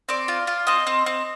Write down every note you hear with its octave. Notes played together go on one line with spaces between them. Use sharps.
C4 D5
F4
F4
C4 D#5
C4
C4